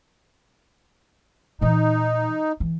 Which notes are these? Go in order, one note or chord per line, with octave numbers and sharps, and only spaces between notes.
A#2 E3 D#4
E3